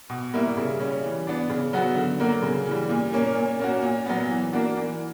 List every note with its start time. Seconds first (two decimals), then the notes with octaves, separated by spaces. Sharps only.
0.10 B2
0.33 G3 A#3 E4
0.57 C#3
0.80 G3 C#4
1.04 E3
1.27 B3 D4
1.49 C#3
1.73 F#3 B3 F#4
1.96 D3
2.20 F#3 A#3
2.42 C#3
2.67 E3 G3
2.89 A#2
3.13 A#3 C#4
3.35 A#2
3.60 A#3 C#4 F#4
3.82 A#2
4.06 F#3 B3
4.29 E3
4.53 A#3 D4 F#4
4.76 E3